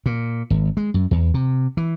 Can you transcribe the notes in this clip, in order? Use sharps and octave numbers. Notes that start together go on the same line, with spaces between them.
A#2
G#1
G#3
F#2
E2
C3
E3